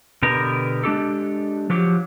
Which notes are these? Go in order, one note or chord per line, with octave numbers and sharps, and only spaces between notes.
B2 D3 B3 G4 A#4 A#5
G#3 D4 G4 A4
F3 F#3 G4